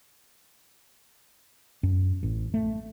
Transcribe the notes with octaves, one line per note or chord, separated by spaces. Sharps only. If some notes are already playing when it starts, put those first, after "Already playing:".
F#2
A1
A3